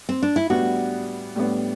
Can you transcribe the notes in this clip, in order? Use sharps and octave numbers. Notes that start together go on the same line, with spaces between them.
C4
D4
E4
A2 G3 B3 D4 F#4
A2 G3 B3 D4